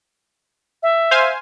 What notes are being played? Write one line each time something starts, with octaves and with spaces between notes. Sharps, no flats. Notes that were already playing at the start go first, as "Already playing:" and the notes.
E5
C5 F5 G#5